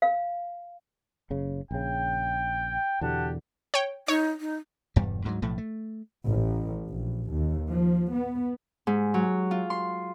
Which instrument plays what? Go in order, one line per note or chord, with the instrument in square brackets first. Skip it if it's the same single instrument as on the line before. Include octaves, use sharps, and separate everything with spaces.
[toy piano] F5
[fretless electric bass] F#1 C#3
[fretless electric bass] A#1 C#3 [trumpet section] G5
[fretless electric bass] E2 B2 D3 [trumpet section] G4 F#5 A5
[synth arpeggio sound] C#5 G5
[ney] D#4 [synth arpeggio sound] C#5
[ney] D#4
[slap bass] E1 E2 G2 G3
D2 G#2 F3 F#3
B1 A2 F3 A3
A3
[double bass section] A1
A#1
D#2
F3
B3
[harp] G#2
F#3
F4
C6